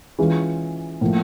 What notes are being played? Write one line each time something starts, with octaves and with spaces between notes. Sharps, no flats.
E3 G#3 C#4 F4 G#4
A2 F3 A#3